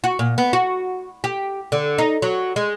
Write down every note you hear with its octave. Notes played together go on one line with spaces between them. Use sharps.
F#4
A#2
B3
F#4
G4
D3
D#4
F#3
G#3